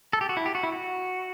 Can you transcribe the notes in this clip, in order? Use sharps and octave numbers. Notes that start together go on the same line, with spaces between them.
A4
G4
F#4
E4
G4
F#4
E4
F#4